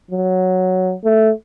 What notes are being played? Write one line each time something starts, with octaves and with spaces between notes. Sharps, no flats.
F#3
A3